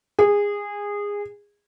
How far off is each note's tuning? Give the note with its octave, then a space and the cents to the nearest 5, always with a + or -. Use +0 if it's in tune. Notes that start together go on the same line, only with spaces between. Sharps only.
G#4 -20